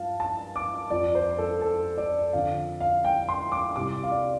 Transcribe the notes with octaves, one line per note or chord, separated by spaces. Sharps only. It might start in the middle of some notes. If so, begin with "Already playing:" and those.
Already playing: G2 F3 F5 A5
A5
D6
F2 F3 D5
C5
A4
A4
D5
F2 D3 F3 F5
F5
G5
C6
D6
C2 C3 G3 D6
F5
D5